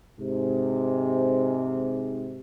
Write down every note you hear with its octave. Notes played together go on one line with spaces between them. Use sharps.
G#2 C3